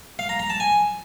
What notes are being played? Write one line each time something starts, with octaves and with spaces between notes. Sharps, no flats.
F5
A#5
A#5
A5
G#5